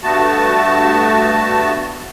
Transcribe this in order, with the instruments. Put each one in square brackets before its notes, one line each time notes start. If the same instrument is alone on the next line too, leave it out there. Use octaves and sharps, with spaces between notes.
[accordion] G2 A3 B3 F#4 A5